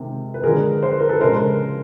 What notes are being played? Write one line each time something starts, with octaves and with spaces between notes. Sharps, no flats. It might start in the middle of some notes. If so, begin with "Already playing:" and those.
Already playing: C3 D#3 G#3
B4
D3 F3 G#3 G#4 A#4
C5
B4
A#4
A4 B4
C#3 F3 G#3 A#4 C5